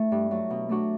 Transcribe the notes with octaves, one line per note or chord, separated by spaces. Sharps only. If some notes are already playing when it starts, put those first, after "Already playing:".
Already playing: A3 D4 E4
G2
F#3 A3
B2
A3 D4 F#4